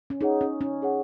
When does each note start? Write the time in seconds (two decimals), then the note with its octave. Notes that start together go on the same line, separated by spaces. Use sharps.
0.10 C#4
0.21 D#4 G#4 C#5 F#5
0.41 C#4
0.61 C#4
0.82 G#4 C#5 F#5